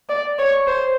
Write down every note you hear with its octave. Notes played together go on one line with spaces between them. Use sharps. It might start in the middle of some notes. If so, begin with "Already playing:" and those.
D5
C#5
C5